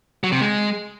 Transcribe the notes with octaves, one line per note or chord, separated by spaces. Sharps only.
F#3
C3
G#3